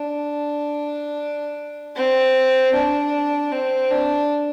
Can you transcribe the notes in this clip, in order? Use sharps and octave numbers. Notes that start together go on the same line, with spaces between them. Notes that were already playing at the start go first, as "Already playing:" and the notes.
Already playing: D4
C4
D4
C4
D4